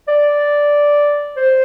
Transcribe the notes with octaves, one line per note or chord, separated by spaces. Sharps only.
D5
C5